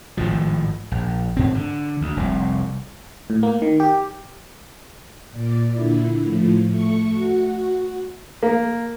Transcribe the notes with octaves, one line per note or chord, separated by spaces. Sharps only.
G#1 A2 F3
A#1
G#2 C4
D3
D2
F1 C2
A2
A#3
D#3
G4
A#2 D5
A#2 D3 E4
A2 F3
A3 C#6
F#4
A#3